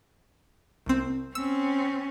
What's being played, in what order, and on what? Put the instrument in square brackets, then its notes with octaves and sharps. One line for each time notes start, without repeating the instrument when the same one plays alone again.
[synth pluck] C2 C4
[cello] C4 C#4 [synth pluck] E6